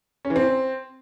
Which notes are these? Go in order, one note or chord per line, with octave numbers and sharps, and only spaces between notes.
C#4
E3
C4